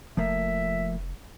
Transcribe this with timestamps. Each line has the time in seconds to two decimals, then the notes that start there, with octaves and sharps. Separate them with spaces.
0.17 F1 F3 A3 A#3 E5